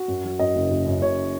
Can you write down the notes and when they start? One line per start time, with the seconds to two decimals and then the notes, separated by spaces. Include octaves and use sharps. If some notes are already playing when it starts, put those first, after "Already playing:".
Already playing: F#4
0.08 F#2
0.24 F#3
0.39 F#2 D#5
0.56 F#1
0.71 F#1
0.87 F#2
1.01 F#1 C#5